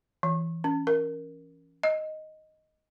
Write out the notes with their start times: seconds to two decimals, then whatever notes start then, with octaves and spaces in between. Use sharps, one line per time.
0.23 E3
0.64 C#4
0.87 A#4
1.83 D#5